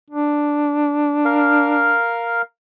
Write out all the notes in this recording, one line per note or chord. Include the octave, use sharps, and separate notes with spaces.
D4
A#4 F5